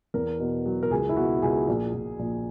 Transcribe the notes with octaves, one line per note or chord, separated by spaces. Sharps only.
E2 A#4
B2
F#3
A#4
C#2 G#4
E4
B2 F#4
C#2 G#4
A#1
A#1
A#1